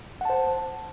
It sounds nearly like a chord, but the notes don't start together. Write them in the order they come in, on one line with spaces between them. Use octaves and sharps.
F#5 A5 C5